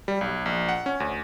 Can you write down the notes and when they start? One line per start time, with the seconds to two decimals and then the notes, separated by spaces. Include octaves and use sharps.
0.08 G3
0.21 B1
0.46 A#1
0.69 F#5
0.86 C#4
1.00 D2